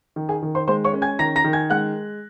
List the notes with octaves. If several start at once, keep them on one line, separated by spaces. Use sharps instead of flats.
D#3
G#4 G#5
D#3
C5 C6
G#3 C5 C6
C#5 C#6
C#4
G#5 G#6
D#3 A#5 A#6
A#5 A#6
D#3
G#5 G#6
G#3 F#5 F#6